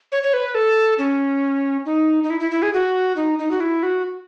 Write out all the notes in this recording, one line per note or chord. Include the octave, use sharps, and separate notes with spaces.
C#5
C#5
B4
A4
C#4
D#4
D#4
E4
E4
E4
G#4
F#4
D#4
D#4
F#4
E4
F#4